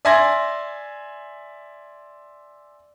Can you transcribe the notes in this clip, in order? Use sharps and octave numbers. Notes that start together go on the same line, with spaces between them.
D5 E5 G#5 C6 G#6 A#6